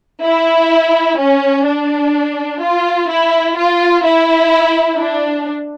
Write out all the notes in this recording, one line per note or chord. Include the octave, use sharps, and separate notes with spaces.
E4
C#4
D4
F4
E4
F4
E4
D4